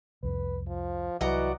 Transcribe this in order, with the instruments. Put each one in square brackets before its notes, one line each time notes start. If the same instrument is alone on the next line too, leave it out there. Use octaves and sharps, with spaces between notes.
[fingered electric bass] C2 F2 [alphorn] B4
[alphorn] F3
[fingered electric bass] C2 F#3 [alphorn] E3 [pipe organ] F#4 D5 [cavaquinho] D#5 F#5 A#5